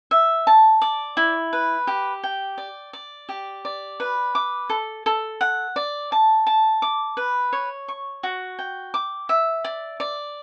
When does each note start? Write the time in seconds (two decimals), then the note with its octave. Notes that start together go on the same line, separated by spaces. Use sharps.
0.11 E5
0.47 A5
0.82 D5
1.17 E4
1.53 B4
1.87 G4
2.23 G5
2.58 D5
2.93 D5
3.29 G4
3.65 D5
4.00 B4
4.35 D6
4.70 A4
5.06 A4
5.41 F#5
5.76 D5
6.12 A5
6.47 A5
6.82 D6
7.17 B4
7.53 C#5
7.88 C#6
8.23 F#4
8.59 G5
8.94 D6
9.29 E5
9.65 D5
10.00 D5